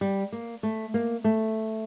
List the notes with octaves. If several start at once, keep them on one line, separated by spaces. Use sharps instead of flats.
G3
A#3
A3
A#3
A3